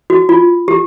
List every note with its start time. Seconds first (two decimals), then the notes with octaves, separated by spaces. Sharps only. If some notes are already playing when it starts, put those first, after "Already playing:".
0.10 F#4
0.29 F4
0.68 G4